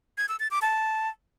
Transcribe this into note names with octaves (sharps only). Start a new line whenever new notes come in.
G#6
E6
A6
D6
A5